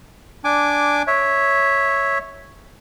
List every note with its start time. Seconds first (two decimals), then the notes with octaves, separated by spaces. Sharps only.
0.44 D4 G#5 D6
1.07 C#5 E5